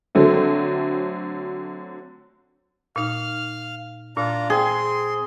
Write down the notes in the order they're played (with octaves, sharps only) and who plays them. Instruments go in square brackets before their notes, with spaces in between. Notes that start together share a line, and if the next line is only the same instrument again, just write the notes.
[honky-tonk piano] D3 F#3 A3 C4
[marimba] A#2 D#4 [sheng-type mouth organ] F5 F6
[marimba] A#2 [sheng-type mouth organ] D4 F4 A#5
[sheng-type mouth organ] C4 C6 [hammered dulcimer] G#4 [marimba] G5